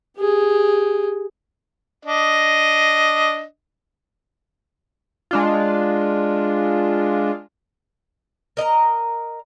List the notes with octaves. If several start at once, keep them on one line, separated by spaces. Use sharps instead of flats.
G4 G#4
D4 D#5
G#3 D4 F4
A#4 D#5 E5 A#5